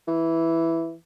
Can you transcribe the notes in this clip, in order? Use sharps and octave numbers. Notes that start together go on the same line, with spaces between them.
E3